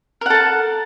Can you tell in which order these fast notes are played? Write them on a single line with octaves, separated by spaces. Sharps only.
A#4 F#5 A4 A5